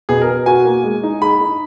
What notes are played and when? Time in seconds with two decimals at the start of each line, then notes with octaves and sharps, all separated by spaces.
0.09 B2 G#4
0.22 A#4
0.28 B2
0.46 F#4 G#5
0.65 A#3
0.84 G#3
1.03 D#4
1.22 G#4 B5
1.41 D#4